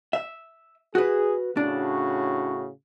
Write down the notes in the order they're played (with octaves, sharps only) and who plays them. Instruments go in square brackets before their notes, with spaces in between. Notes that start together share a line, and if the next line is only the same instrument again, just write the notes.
[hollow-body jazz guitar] E5
[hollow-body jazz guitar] F#4 B4 [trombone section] G#4
[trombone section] A2 C#3 F#4 [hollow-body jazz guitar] D4